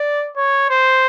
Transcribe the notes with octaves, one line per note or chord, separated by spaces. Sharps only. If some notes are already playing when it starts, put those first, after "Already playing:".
Already playing: D5
C#5
C5